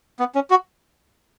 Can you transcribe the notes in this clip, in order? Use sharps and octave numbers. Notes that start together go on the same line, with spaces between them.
B3
C#4
F#4